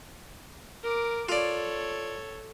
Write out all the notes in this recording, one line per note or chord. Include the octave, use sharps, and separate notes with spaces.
A#4 D6
F4 A4 C#5 D5